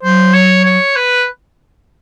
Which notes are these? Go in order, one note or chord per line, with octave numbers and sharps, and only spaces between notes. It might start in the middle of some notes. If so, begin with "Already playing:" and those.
F#3 C5
C#5
C#5
B4